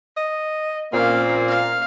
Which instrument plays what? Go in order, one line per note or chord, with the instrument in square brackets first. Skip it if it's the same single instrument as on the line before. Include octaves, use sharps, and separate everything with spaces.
[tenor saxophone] D#5
[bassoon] A#2 [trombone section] A#3 [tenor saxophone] C4 [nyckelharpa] C#4 F5
[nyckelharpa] F5